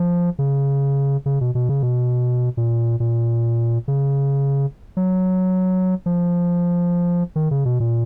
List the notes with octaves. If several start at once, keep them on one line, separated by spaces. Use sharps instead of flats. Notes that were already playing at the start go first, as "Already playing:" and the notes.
Already playing: F3
C#3
C#3
B2
B2
C#3
B2
A#2
A#2
C#3
F#3
F3
D#3
C#3
B2
A#2